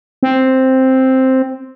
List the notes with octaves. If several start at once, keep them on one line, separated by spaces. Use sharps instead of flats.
C4